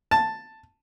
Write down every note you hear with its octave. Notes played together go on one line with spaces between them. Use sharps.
A5